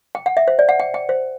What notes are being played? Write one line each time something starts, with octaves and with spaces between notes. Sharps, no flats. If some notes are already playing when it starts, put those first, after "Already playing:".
G5
F#5
E5
C5
D5
F#5
G5
G5
C5